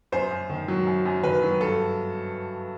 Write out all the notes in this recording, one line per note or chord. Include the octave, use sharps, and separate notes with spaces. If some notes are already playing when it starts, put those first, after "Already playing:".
F#2 C5
F#2
D#3
F#3
F#2
F#2
D#3 B4
F#3
G2 A4